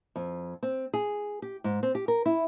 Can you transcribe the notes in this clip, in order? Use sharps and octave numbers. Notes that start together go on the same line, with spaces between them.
F2
C4
G#4
G4
G#2
C4
G4
A#4
E4